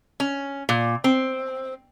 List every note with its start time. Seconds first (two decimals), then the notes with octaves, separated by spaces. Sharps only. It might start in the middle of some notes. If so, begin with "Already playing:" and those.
0.20 C#4
0.69 A#2
1.04 C4